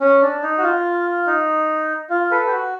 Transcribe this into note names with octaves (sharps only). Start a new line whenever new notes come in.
C#4
D4
D#4
F#4
F4
D#4
F4
A4 B4
G4
F#4